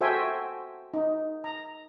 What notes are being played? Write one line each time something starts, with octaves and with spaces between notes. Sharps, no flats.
F#4 A4 C5 E5 G5 G#5
D#4
A#5